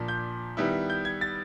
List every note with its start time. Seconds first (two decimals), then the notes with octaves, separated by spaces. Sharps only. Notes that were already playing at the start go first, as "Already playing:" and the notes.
Already playing: A#2 F3 A#3 D4
0.08 G6
0.57 D#3 G3 B3 E4
0.90 G6
1.05 G#6
1.21 A6